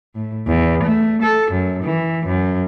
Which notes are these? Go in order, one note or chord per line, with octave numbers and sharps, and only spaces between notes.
A2
E2
A3
A4
F#2
E3
F#2